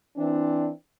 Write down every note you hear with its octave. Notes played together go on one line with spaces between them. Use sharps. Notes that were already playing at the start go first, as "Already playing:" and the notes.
E3 C4 D4